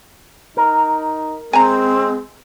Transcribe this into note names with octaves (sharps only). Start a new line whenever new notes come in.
D#4 A#4
G#3 C4 G#5 A#5